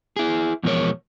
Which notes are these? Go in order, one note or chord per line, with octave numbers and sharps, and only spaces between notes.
E4 G#4
E2 B2 F3 G#3 A#4 C#5